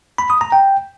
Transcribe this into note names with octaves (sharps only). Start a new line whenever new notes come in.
B5
D#6
A#5
G5